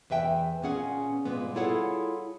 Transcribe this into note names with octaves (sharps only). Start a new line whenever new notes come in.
E2 B4 E5 G5
A#2 B3 C#4 G#4 F#5
G2 A#2 G#3 B3
E4 F4 G#4 A4 C#5 F#5